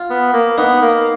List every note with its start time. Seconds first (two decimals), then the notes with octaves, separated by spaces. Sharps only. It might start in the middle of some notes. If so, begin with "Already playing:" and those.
Already playing: F4
0.10 B3
0.33 A#3
0.58 B3 D#4
0.82 A#3